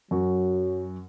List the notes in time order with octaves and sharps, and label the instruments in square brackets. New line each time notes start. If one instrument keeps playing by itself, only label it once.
[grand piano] F#2 F#4 [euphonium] F#3